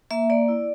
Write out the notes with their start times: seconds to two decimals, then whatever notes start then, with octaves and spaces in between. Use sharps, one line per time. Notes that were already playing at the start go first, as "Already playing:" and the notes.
0.11 A#3 E5
0.30 A#3 D5
0.48 E4